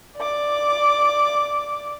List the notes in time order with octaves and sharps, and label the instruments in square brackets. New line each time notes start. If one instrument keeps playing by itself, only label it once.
[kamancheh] D5 D6